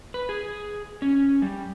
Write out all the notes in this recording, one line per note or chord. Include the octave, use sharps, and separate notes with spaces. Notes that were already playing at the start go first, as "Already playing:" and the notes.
B4
G#4
C#4
G3